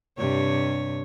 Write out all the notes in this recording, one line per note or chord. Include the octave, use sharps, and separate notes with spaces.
G2 C3 C#5